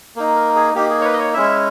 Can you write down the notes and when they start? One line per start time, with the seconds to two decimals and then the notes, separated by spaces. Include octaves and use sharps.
0.16 A#3 D#4
0.36 A#4
0.56 G#4
0.75 A#3 D#4 G4
0.90 G#4
1.01 C#5
1.05 B4
1.13 D#5
1.19 C#5
1.34 G#3 C#4 E4 E5